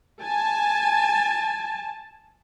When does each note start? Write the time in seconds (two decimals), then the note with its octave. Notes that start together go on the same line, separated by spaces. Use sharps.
0.23 G#5 A5